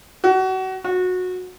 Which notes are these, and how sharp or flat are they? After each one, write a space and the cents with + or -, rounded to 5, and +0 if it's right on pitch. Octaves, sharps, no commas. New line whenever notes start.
F#4 +30
F#4 -20